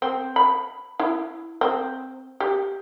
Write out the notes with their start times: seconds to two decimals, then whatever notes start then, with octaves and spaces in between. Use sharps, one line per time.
0.02 C4
0.36 B5
1.00 E4
1.61 C4
2.40 G4